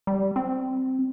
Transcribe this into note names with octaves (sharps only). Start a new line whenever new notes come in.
G3
C4